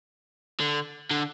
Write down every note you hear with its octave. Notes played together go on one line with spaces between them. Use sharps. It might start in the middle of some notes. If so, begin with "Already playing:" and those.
D3
D3